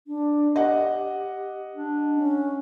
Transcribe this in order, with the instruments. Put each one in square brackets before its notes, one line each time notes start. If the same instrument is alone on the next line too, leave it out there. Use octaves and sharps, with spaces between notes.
[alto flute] D4
[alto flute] G4 [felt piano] D#5 F#5
[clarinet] D4
[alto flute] C#4